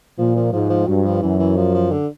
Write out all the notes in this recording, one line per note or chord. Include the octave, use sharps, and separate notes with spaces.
A#2 F3
F3
G#2 F3
F3
G2 F#3
F3
F#2 E3
E3
F3
F3
D3